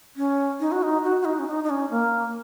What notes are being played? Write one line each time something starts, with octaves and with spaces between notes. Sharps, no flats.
C#4
D#4
F#4
D#4
F#4
F#4
D#4
C#4
D#4
D#4
C#4
A#3